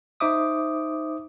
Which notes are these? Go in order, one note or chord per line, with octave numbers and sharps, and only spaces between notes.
D#4 C5 E5 D6 D#6